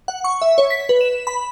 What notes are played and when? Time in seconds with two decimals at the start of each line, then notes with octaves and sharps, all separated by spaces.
0.08 F#5
0.24 C#6
0.42 E5
0.58 C#5
0.70 B6
0.89 B4
1.01 E7
1.27 B5